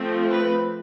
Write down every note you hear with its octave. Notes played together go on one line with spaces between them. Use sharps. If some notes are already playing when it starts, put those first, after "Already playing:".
Already playing: F3 A3 C4
B4